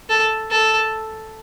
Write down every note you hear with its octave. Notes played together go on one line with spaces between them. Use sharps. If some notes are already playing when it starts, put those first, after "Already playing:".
A4
A4